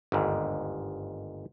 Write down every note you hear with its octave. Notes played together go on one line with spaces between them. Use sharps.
G1 D#2 G#2